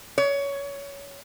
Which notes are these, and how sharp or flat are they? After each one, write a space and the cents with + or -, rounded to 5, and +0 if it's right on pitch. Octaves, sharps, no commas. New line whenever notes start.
C#5 +20